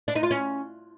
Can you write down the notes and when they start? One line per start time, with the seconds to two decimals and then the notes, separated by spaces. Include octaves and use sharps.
0.08 D4
0.15 D#4
0.23 F4
0.31 C#4